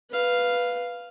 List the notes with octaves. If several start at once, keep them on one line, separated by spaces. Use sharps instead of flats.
B4 F5